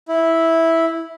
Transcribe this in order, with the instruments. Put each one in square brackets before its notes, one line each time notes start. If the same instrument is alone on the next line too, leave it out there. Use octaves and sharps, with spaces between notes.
[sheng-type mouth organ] E4